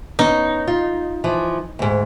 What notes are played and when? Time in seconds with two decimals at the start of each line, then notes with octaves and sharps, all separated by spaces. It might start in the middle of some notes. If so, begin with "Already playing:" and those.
0.19 B3 C#4 D#4
0.67 F4
1.24 E3 F3
1.79 D2 G#2